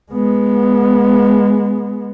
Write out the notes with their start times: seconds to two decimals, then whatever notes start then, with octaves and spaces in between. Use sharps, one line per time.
0.12 G#3 B3